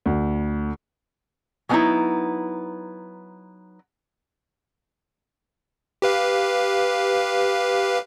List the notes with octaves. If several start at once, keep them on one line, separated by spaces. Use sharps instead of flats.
D2
F#3 G#3 B3 C4 D#4 E4
G4 B4 F5